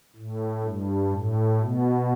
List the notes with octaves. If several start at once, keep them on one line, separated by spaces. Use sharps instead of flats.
A2
G2
A2
B2